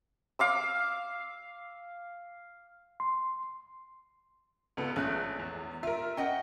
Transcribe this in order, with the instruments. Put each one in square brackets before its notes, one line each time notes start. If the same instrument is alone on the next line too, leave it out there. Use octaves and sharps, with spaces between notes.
[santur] F5 D6 E6
[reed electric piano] C6
[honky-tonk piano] C#2 B3 A4
[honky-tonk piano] A#1 A5 F#6 [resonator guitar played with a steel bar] G#3 A3 C#4
[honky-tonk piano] E2
[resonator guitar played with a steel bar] F4 [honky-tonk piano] A#4 E5
[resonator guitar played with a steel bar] C#4 D#5 F#5 [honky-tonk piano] G5